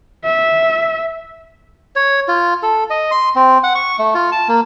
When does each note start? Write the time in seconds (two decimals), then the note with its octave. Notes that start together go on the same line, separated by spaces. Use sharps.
0.25 E5
1.96 C#5
2.28 F4
2.63 A4
2.90 D#5
3.11 C6
3.35 C4
3.64 F#5
3.75 C#6
3.99 A3
4.15 F4
4.32 A5
4.48 A#3